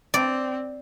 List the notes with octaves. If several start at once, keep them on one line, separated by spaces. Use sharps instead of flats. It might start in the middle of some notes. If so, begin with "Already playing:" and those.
C4 D5